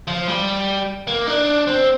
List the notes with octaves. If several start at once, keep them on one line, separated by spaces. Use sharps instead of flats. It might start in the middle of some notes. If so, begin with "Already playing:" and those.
F3
G3
A#3
D4
C4